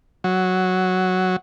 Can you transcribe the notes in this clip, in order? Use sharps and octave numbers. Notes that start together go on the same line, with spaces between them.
F#3